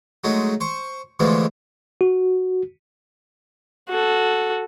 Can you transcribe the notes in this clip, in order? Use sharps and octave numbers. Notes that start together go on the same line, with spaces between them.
F#3 G#3 A3 D#4
C5 C#6
B2 D3 E3 F3 G#3 A3
F#4
F#4 A4